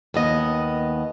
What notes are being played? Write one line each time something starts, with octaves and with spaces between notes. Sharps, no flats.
D#2 B3 D#5